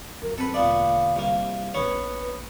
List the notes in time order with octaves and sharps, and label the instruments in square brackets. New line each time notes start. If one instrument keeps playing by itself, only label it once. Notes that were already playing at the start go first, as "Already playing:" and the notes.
[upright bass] F#2 [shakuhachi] A#4
[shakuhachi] C4 [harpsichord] A4 B4
[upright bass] E1 D3 [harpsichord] A#2 B3 D5 [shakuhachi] F5
[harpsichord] C2 A#3
[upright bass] A#1 A3 [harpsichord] B3 C#4 C#5 [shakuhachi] B4